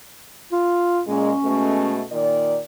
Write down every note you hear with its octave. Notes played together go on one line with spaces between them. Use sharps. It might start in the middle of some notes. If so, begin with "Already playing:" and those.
F4
A#2 G#3 C#4
B2 G#3 A3
A#2 D#3 D5